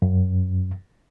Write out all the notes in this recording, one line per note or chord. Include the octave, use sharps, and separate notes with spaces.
F#2